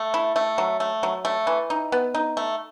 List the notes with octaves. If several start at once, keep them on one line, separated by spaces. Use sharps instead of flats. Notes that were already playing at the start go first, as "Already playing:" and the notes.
Already playing: A3
E4
A3
F#3
A3
F#3
A3
E3
D#4
B3
D#4
A3